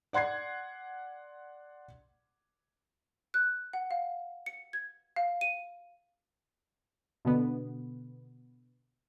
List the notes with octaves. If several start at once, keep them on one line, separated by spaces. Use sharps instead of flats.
D5 F#5 C6 G#6 C7
F#6
F#5
F5
C#7
G#6
F5
D#7
B2 D3 B3